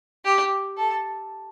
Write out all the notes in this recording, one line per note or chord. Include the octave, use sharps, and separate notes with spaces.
G4
A4